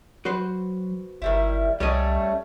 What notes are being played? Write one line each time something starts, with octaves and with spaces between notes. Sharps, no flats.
F#3 F#4 B4 C5
G1 D#3 G3 E4
C2 G3 A3 C#4 D#5